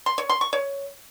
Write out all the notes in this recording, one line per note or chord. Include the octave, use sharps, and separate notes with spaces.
C6
C#5
C6
C#6
C#5